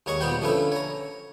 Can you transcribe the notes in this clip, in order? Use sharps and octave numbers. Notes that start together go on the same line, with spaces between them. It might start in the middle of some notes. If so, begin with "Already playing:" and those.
D#2 G#3 C#5 A#5 C#6
A#2 G3 B3 B4 C5 G5
D3 F3 A3 C#4 B4 E5
C#5 A#5